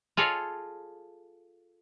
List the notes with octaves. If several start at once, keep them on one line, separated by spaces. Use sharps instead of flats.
F4 G#4 A4 C#5 D#5 F5